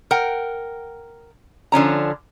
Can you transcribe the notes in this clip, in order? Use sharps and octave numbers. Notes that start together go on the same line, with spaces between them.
A#4 F#5 G5
D3 F3 C#4 A#5